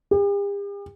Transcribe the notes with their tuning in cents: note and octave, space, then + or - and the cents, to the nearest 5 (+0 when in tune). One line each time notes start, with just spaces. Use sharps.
G4 +45